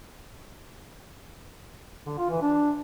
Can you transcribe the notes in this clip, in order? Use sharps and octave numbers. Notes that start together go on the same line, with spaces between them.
D3
F4
E3
D4